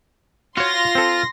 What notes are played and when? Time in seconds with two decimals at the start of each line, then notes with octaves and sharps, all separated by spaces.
0.57 F4 F#4 C#5 C6 A#6
0.95 C4 A4